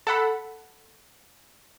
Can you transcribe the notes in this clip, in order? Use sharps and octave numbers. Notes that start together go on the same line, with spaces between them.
A4 F#5 B5